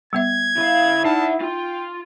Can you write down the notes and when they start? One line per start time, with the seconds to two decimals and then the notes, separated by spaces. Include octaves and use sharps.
0.13 G3 B3 E5 G#6
0.57 C#3 E4 F5
1.04 D#4 E5 F#5 A5
1.41 F4 G5